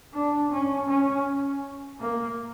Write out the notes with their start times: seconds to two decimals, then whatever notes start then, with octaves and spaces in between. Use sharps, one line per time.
0.14 D4
0.52 C#4
0.89 C#4
2.00 A#3